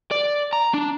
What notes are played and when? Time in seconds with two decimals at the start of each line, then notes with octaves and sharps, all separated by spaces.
0.11 D5
0.53 A#5
0.74 D4